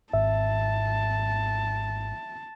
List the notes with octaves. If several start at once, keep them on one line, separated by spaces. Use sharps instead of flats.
G#1 G#2 E5 A5